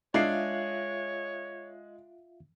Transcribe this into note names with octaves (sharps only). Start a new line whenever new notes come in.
G#3 D4 F4 C#5 E5 F5 C7